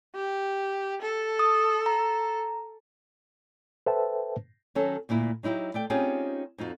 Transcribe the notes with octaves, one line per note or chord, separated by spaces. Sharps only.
G4
A4
D#6
A#5
A4 B4 C5 E5 G5 A5
D#3 F#3 C#4 F#4 A4
D2 A#2 A#3 E4
F#3 D#4 E4 F#4 G4
A3 D5 G5
C4 C#4 D#4 F4 G4 G#4
F2 D#4 F4 F#4